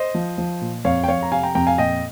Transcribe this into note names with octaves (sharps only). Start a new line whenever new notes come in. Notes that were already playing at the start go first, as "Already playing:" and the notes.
Already playing: C5 D#5
F3
F3
A#2
F2 C#5 F5
G5
F2 C#5 F5
A#5
C3 F5 G#5
G5 A#5
F2 G5 A#5
F5 G#5
A#2 D#5 G5